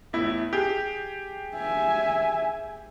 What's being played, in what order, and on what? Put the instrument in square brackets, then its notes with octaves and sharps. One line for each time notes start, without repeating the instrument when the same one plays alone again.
[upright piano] E2 A2 E4
G4 G#4
[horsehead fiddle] E5 G#5